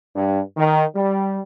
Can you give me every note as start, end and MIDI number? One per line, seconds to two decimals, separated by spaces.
0.15 0.40 43
0.56 0.84 51
0.95 1.39 55